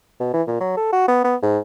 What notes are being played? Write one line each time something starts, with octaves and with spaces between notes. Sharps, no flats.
B2
E3
A#2
F#3
A4
F#4
B3
B3
G#2